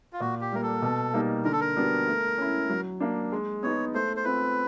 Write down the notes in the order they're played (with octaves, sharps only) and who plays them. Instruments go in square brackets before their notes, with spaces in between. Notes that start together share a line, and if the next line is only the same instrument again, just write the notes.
[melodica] F4
[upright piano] A#2 [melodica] F#4
[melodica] G4
[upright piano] G3 A#3 [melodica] A#4
[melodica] A4
[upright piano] B2
G3 A#3 D#4
[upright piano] D3 [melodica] A#4
[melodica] A4
A#4
[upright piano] G3 B3 D4 F#4
A3
C#4 E4
F#3
A#3 D4
G#3
[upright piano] B3 D#4 G#4 [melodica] C#5
[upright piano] A3 [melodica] C5
[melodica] C5
[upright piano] C4 F4 [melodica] B4